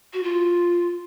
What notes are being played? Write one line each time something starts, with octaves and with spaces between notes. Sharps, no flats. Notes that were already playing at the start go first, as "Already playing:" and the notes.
F#4
F4